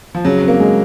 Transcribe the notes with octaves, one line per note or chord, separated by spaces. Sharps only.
F3
C#3 F#3
C4
A#3
G#3